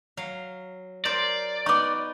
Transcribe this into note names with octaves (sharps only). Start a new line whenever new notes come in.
F#3 F5
A#4 C5 D5
B3 D#4 C#6 D6